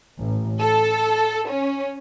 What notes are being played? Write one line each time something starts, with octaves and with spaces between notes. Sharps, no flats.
A1
A4
C#4